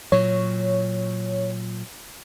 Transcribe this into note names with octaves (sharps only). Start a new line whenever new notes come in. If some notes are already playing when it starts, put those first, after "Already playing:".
A#2 F#3 C#5